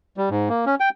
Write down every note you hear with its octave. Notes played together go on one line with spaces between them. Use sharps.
G3
G#2
A#3
C#4
G5